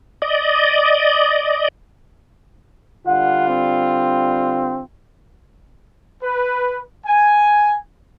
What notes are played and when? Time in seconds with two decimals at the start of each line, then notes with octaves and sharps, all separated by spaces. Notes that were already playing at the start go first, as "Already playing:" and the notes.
0.22 D5 D#5
3.07 D3 G3 F4 F#5
3.48 C4
6.23 B4
7.06 G#5